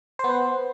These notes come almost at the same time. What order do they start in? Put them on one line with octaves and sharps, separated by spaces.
C5 B3 B4